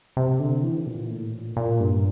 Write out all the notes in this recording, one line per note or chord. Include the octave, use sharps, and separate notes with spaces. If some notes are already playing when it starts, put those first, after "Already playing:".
C3
D3
E3
A#2
A2
A#2
A#2
G2